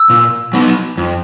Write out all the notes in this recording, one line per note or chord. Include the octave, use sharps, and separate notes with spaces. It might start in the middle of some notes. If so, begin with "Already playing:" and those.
Already playing: E6
A#2
F#3 B3 D#4
F2